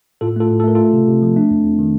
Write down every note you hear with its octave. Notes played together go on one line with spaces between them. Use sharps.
A2 F4 A4
A3 F4 A4
A2
A4
A3 A#4
A3 F4 A4
C3
C3
F3
A3 D4
F2
F2
D#3